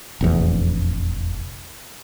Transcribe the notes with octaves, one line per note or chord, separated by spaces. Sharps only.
F1 A#1 E2